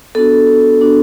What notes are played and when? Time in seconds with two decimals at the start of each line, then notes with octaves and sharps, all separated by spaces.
0.15 B3 D4 F#4 A4
0.79 B3 D4 F#4